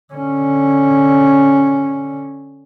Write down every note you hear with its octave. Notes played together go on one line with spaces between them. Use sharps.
D3 C#4